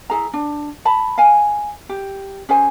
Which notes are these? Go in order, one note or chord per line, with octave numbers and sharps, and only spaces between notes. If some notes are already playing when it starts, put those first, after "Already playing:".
E4 G#4 A#5
D4
A5 B5
F5 G#5
G4
C#4 G#4 C5 G#5